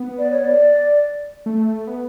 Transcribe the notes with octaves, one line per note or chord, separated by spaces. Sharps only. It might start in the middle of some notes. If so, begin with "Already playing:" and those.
Already playing: B3
D5
C#5
D5
A3
B3